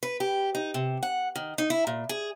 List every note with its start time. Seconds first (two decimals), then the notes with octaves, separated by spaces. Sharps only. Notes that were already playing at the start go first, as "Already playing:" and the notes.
0.03 B4
0.20 G4
0.55 D#4
0.74 C3
1.03 F#5
1.36 D#3
1.58 D#4
1.70 E4
1.87 A#2
2.09 G#4